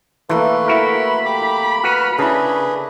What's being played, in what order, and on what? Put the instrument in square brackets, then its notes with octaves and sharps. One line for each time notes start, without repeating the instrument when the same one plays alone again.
[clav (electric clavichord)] E3 [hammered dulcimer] A3 A#3 A4 [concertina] B4 C6
[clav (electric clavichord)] E4 F#4 A#4 [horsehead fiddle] B5
[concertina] G4 D6
[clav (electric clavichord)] F#4 B4 [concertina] F6 F#6
[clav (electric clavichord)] C#3 [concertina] D4 G#4 B4 [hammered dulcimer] E4 A#5